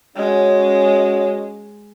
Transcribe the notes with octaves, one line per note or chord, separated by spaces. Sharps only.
G#3 C#4 F#4 C#5